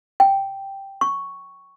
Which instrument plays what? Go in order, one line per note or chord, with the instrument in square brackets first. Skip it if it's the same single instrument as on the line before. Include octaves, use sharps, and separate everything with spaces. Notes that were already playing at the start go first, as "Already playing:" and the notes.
[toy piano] G5
C#6